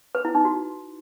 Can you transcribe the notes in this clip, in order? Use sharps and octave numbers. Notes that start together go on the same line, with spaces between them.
B4
E4
D#4
F#4